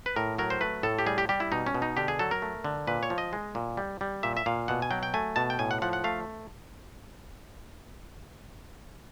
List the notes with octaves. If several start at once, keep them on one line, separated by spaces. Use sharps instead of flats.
B4
A2 A#4
F#3 A#4
C5
A3 B4
A2 A4
G4
G3 G#4
G4
G3 G4
E4
B2 D#4
C#4
B2
D#4
D3 G4
G#4
F#3 A4
A#4
A3
D3
A#2 B4
C#5
F3
D#5
G#3
A#2
G3
G3
A#2 E5
E5
A#2 F5
B2 F#5
G#5
F#3 G5
G5
A3 G#5
B2 A5
G5
A2 G#5
F#5
F3 F#5
F#5
A3 F5